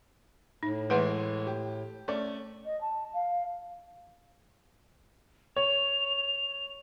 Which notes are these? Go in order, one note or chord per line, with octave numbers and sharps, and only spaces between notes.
A2 D#4
E3 G#3 A3 B4 F#5 C6
G4
A3 C#4 D5
D#5
A5
F5
C#5 F7